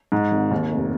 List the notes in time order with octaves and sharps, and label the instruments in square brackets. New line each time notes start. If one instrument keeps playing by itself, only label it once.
[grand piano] G#2
G#1
D#2
F1